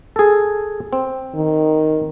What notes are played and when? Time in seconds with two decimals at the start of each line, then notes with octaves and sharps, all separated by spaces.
0.16 G#4 A4
0.93 C4
1.35 D#3